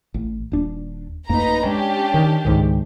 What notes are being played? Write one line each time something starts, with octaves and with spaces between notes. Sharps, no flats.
A1
D#1 D4
A1 F#2 A#3 D#4 B4 A#5
G#3 C#4 D4 G4
D#3
C#2 G#2 D#3